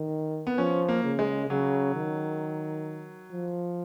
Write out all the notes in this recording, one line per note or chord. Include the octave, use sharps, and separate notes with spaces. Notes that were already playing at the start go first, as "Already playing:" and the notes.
Already playing: D#3
B3
F3 C#4
A#3
C#3
G#3
C#3 F#3
D#3
F3